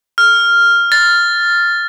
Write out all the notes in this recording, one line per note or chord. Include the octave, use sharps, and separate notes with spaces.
F6
A6